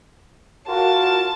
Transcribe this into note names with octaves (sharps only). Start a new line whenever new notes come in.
F4 F#4 A#4 A5